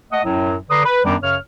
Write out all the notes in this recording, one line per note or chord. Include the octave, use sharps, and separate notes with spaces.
A3 D#5 F#5
F#2 A2 F#3
D3 B4 D5 A#5 C6 D#6
B4
F#2 D#3 G3 B3 D4 D6
F#2 C#3 C#5 F6